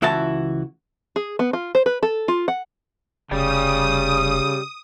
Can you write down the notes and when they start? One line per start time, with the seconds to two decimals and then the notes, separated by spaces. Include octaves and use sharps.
0.02 C#2 E3 E4 F#4 A5
1.16 G#4
1.39 B3
1.53 F4
1.75 C5
1.86 B4
2.03 A4
2.28 F4
2.48 F#5
3.31 F1 C#3 G4 D5 G5 D#6